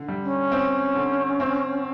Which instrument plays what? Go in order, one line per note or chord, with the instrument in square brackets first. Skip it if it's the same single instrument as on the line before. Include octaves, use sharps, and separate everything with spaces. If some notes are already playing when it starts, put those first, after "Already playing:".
Already playing: [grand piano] D3
G3
[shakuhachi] C#4
[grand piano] C4
D3
C4